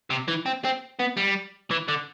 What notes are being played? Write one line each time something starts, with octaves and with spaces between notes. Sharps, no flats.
C3
E3
C4
C4
B3
G3
E3
D3